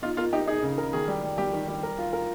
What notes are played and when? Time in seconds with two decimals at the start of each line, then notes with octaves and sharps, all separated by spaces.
0.03 D#4 F4
0.17 F4 A#4
0.33 D#4 G4
0.48 D#4 G#4
0.62 C#3
0.78 A#4
0.93 D#3 G#4
1.08 G3
1.23 G3
1.38 G3 G4
1.53 D#3
1.68 G3
1.83 A#4
1.98 F4
2.13 A#4